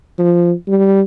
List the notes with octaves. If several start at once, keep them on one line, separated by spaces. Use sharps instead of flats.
F3
G3